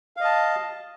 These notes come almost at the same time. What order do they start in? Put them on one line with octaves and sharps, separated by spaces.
F5 D#5 A5